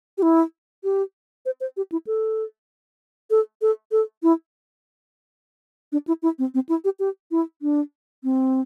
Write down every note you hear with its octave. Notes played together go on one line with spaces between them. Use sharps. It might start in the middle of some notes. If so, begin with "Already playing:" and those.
G4
E4
G4
C5
C5
G4
E4
A4
A4
A4
A4
E4
D4
E4
E4
C4
C4
E4
G4
G4
E4
D4
C4